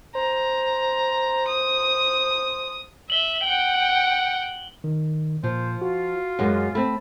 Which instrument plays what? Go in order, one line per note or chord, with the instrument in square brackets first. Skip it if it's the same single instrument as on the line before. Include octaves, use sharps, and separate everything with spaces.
[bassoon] C5 [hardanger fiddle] A#5
[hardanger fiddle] D#6
[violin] E5 [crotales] F#7 G7
[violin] F#5 G5
[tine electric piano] D#3
[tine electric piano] A#2 [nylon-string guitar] F3 [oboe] C5
[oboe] F4 [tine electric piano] F#4
[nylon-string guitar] F#2 G#3 B3
[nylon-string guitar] A3 C4 [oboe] B5